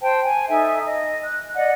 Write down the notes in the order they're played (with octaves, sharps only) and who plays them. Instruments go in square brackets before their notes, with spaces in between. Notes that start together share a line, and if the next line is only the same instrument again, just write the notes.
[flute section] C5 G5 A5
G#5
D#4 A4 E5 G#5
D#5
F#6
D5 D#5 F#5